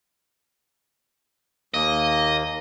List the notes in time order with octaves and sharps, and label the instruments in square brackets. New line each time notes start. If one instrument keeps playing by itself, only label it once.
[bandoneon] D#2 A#3 [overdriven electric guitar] D#5